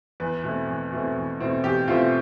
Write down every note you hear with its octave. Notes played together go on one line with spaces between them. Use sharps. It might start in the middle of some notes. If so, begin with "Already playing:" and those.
E2 B4
B2 A3 C4
E2
B2 A3 C4
E2
B2 A3 C4
E2 G4
B2 A3 C4 F4